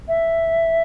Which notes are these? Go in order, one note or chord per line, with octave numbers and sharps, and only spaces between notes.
E5